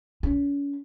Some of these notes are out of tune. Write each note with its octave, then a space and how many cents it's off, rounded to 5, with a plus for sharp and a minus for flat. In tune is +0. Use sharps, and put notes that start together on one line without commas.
C#4 +35